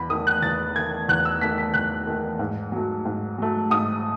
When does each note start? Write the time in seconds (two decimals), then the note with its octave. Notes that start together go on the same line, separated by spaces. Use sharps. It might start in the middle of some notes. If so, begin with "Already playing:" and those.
Already playing: E2 B5
0.10 D#3 D#6
0.14 A3
0.27 F#6
0.42 E2 A6
0.76 D#3 A3 G#6
1.08 E2 F#6
1.25 E6
1.41 D#3 A3 B6
1.58 B6
1.74 E2 F#6
2.07 D#3 A3
2.39 G#2
2.72 F#3 A3
3.05 G#2
3.38 F#3 A3
3.70 G#2 D#6